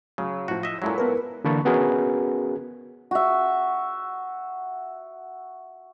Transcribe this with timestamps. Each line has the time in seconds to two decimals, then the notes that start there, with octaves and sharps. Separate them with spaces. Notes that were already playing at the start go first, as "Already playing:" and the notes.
0.18 C#3 F#3
0.48 A2 F3 F#4
0.63 D#5 E5
0.82 A#2 F#3 G#3 E4 A4
0.98 B3 A#4 B4
1.44 D3 E3 A#3 A5 B5 C#6
1.65 B3 C#4 F#4 G#4 A#4 B4
3.11 F#4 E5